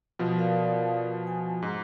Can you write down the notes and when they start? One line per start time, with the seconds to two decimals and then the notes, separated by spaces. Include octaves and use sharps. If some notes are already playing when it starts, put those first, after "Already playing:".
0.19 B2 F3
0.37 A#4 D5 F5
1.27 G#5
1.62 G#2 A#5